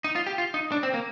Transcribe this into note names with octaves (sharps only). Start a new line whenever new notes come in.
D#4
F4
G4
F4
D#4
D4
C4
A#3